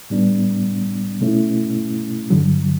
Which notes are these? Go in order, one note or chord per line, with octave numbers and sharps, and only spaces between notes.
A2 G3 B3 D4
B2 A3 C#4 E4
G2 D3 F#3